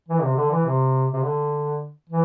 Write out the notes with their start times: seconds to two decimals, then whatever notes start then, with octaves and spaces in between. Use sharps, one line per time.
0.09 E3
0.22 C3
0.37 D3
0.51 E3
0.65 C3
1.13 C3
1.23 D3
2.10 E3